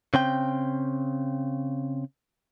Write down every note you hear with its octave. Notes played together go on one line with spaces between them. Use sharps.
C#3 C4 G5